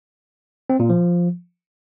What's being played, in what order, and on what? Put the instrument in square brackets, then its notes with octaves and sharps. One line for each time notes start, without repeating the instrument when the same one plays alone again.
[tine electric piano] C4
A#2
F3